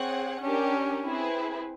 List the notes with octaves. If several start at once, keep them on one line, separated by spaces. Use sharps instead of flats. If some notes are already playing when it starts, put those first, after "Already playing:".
Already playing: C4 G#4 C#5 F#5
C#4 D4 G4 A#4
C4 E4 G#4 B4